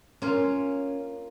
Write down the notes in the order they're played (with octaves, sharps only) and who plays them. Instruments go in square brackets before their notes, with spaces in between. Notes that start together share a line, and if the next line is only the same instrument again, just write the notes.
[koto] A#3 F4 [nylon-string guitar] C#4